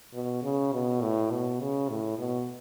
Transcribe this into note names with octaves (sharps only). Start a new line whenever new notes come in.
B2
C#3
B2
A2
B2
C#3
A2
B2